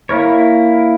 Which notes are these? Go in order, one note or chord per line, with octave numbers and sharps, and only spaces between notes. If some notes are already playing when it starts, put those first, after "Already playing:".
A#3 E4 A#4 C#5